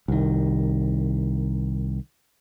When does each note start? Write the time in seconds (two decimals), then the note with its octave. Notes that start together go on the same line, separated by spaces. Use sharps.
0.08 C2 D#3